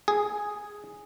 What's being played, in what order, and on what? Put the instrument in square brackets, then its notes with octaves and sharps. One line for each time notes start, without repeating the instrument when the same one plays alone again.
[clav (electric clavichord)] G#4